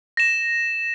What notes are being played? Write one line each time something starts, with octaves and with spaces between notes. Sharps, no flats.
A#6 E7